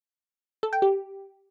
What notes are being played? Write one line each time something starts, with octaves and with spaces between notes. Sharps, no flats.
A4
G5
G4